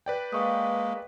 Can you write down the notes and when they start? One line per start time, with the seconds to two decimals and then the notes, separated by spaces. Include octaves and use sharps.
0.06 B4 D5 G5
0.33 G#3 A#3 F5 C#6 D#6